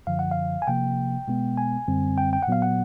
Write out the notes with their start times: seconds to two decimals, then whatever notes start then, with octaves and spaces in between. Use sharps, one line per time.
0.07 F#2 D3 F3 F5
0.19 F#5
0.31 F5
0.62 G#5
0.67 C3 F3 A#3 G5
1.28 B2 G#3 B3
1.58 G#5
1.88 F#2 D3 G3 C4
2.18 G5
2.33 G5
2.42 F#5
2.48 A#2 F#3 B3 F5
2.62 F#5